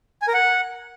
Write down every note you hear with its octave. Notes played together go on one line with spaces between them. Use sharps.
G#5
A#4
F#5